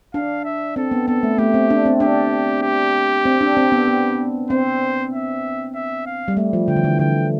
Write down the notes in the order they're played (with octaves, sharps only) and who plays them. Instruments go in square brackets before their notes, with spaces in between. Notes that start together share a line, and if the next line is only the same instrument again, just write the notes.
[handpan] D4 [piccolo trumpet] F5
[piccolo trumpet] E5
[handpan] C4 [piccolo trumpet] A4
[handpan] B3
[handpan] B3 [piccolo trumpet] A4
[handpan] A3
[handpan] A3 [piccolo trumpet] G4
[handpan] C4
D4
C4
[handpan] D4 [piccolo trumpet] G4
[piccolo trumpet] G4
[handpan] C4
D4
C4
B3
B3
[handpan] C4 [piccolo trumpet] C5
[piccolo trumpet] E5
E5
F5
[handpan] G3
A3
F3
[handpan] D3 [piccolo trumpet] G5
[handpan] E3
D3
[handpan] D3 [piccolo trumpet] G5